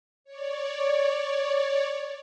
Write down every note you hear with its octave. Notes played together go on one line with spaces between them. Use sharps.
C#5 D5